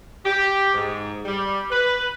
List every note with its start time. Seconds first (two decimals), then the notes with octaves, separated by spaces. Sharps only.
0.25 G4
0.74 G#2
1.24 G3
1.71 B4